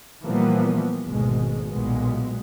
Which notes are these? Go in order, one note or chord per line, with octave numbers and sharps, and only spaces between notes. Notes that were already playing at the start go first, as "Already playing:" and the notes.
A#2 E3 F3 G3 A#3 B3
G#1 D2 B2 G#3
B1 A#2 G#3 B3